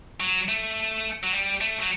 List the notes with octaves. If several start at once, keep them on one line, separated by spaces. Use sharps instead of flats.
F#3
A3
F#3
G3
A3
F#3